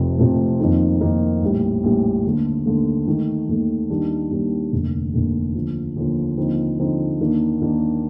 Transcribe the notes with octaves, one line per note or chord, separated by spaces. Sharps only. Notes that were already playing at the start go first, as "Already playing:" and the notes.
Already playing: F1 F2 C3 F3 A3
F1 F2 C3 F3 A3
F2 D#3 A#3 D#4
F2 D#3 A#3 D#4
A#1 A2 G3
A#1 A2 G3
D#2 D3 A3
D#2 D3 A3
D#2 D#3 A3
D#2 D#3 A3
D#2 D#3 G3 D4
D#2 D#3 G3 D4
F1 D#2 D3
F1 D#2 D3
D#2 D3 F3
D#2 D3 F3
D#2 D3 F3 C4 D#4
D#2 D3 F3 C4 D#4
D#2 D#3 A#3 D4
D#2 D#3 A#3 D4